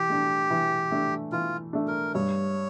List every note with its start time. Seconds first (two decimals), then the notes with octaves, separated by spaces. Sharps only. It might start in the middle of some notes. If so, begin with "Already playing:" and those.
Already playing: E3 G4
0.10 A3 D4
0.50 E3
0.91 A3 D4
1.32 E3 F4
1.73 A3 D4
1.88 A#4
2.14 G2 C#5